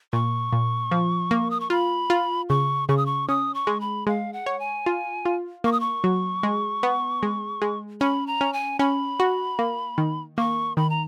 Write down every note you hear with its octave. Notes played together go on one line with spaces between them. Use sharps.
A#2 C#6
A#2
F3
A#3
D#6
C#6
F4 B5
F4
C#3 C#6
C#3 C#6
D#6
C#6
C#4 D#6
C#6
G#3
B5
G#3 F5
F#5
C#5
G#5
F4
F4
A#3 C#6
D#6
C#6
F#3
G#3
B3
G#3
G#3
C#4 B5
A#5
C#4
G#5
C#4 B5
F#4
A#3
D#3
A#3 C#6
D#3 B5
A#5